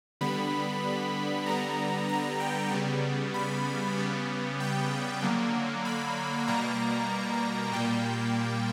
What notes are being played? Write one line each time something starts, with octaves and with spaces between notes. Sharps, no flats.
D3 G3 B3 B5
D3 G3 B3 A#5
A#5
G5
C#3 G3 B3
B5
C#3 G3 B3
G5
D3 F#3 A#3
B5
B2 G3 A#3 A#5
A#2 G3 A#3 G5